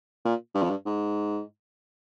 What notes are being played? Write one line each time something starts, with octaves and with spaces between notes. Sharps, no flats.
A#2
G2
F2
G2
G#2